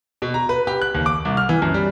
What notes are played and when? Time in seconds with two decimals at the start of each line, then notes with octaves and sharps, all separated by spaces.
0.22 B2
0.34 A#5
0.49 B4
0.67 G4
0.82 F#6
0.95 D#2
1.06 D6
1.25 C2
1.37 F6
1.49 E3
1.62 F#2
1.74 G3